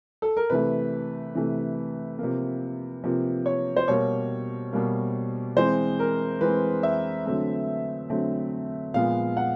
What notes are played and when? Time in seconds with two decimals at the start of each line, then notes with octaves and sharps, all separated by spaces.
0.22 A4
0.37 A#4
0.50 C3 E3 A3 B4
1.35 C3 E3 A3
2.19 C3 F3 A#3
3.03 C3 F3 A#3
3.46 C#5
3.77 C5
3.88 B2 G3 A#3 C#5
4.73 B2 G3 A#3
5.57 E3 G#3 C4 C5
5.99 A#4
6.41 E3 G#3 C4 B4
6.83 E5
7.25 D3 F#3 A3 C4
8.10 D3 F#3 A3 C4
8.94 A#2 F3 G#3 B3 F5
9.37 F#5